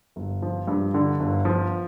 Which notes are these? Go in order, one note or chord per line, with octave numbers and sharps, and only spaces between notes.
G1
F3
G2
D3
G1
F3